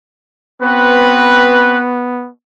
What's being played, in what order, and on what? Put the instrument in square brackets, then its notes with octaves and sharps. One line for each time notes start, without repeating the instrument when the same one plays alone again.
[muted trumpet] B3 [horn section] C4 B4 [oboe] F#4